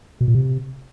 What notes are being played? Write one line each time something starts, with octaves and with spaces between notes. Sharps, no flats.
B2
A#2
C3